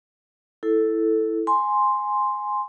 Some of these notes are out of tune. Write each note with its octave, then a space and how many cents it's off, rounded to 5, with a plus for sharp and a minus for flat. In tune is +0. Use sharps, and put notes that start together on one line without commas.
E4 +0 A4 +0
G#5 +0 C6 +0